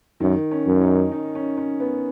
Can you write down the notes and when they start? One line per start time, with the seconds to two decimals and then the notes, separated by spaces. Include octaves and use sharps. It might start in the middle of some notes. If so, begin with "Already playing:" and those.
0.20 F#2 D#3
0.51 C#4
0.66 F#2
0.81 D#4
1.12 D#4
1.35 C#4
1.57 C#4
1.80 B3